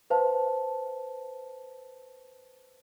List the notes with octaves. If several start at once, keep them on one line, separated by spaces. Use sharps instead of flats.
B4 C5 F5 A5